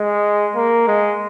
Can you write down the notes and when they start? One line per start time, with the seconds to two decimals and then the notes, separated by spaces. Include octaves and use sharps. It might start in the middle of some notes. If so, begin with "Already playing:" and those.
Already playing: G#3
0.55 A#3
0.88 G#3